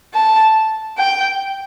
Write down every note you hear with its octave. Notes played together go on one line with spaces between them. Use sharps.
A5
G5